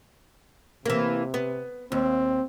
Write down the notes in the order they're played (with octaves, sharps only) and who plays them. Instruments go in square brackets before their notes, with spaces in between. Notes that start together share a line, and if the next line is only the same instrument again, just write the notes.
[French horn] C3 [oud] E3 A#3
[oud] B3
[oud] D#2 [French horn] C4